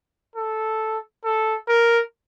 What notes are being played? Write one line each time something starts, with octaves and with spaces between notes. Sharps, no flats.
A4
A4
A#4